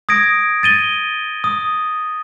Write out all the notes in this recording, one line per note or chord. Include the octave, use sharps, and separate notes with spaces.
D#6 G#6 A#6 D7
A6 D#7 G7
D#6